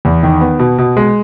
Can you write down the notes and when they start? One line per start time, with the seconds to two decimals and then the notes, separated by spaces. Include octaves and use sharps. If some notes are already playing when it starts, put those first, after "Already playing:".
0.05 E2
0.23 D#3
0.41 B3
0.59 B2
0.78 B2
0.97 G#3